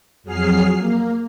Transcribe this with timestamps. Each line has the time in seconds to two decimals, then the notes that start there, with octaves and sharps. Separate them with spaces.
0.24 F2 F#3 G#4 F6 C7
0.77 A#3